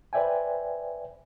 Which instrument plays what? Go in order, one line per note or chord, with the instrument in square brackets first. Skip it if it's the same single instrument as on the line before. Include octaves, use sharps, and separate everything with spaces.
[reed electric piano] B4 C5 D5 E5 G5 G#5